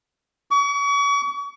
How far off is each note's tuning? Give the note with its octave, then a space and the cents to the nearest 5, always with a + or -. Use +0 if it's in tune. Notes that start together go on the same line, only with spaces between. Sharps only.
C#6 +40